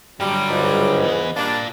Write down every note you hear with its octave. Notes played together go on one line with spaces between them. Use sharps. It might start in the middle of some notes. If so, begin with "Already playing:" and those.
G2 D3 F#3 G3
C#2 G#2 C#3
E3 B3
G3 A#3 D4 F4 D5